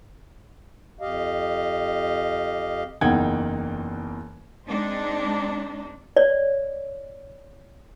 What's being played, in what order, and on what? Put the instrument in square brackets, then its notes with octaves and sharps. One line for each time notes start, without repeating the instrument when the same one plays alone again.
[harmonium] F2 G4 D#5 F5
[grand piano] F#1 E2 D#4 F#5 G5 G#6
[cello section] G#3 C4 D4 D#4
[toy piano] C#5 D5